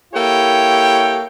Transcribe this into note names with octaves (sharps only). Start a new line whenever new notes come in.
A#3 E4 G4 A4 C#5 G5